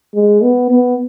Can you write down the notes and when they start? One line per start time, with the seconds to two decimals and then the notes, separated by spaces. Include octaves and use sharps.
0.15 G#3
0.43 B3
0.71 B3